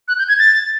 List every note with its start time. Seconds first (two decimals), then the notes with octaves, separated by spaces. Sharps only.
0.08 F#6
0.18 G6
0.28 G#6
0.39 A6